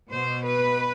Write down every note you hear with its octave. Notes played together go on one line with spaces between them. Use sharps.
B2 C5
B4